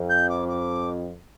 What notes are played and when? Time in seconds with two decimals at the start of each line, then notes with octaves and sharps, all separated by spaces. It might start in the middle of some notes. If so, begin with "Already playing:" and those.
Already playing: F2
0.09 G6
0.29 D6
0.48 D6